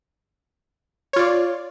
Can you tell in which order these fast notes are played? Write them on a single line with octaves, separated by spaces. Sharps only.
C#5 F4 D5